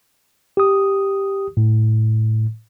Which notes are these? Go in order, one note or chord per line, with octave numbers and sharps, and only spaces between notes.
G4 D#6
A2